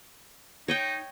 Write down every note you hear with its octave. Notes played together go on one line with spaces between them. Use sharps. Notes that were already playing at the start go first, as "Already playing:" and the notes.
D#4 C#5 D#5 G5